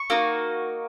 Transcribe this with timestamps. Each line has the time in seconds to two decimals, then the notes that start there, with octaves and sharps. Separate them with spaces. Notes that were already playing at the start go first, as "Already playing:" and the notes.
Already playing: C#6
0.10 A#3 D#4 F#4